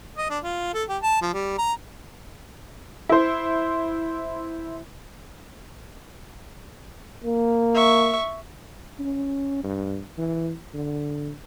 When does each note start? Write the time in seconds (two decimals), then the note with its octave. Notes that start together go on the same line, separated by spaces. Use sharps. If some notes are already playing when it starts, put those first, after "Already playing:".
0.17 D#5
0.30 D4
0.44 F4
0.74 A4
0.89 G4
1.03 A5
1.22 F3
1.34 G3
1.58 A#5
3.09 E4 C5
7.24 A#3
7.75 E5 C#6
8.99 C#4
9.64 G2
10.18 E3
10.74 D3